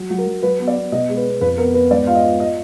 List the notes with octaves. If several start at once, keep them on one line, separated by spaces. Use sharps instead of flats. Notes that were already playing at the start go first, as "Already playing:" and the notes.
Already playing: F#3
F#3
A#4
F#3
F#3 B4
B3
D5
B3
B2 D#5
G#3
B4
B3
F2 B4
B3 A#4
B3 B4
G#2 D5
F4 F5
D#5
F4
D#5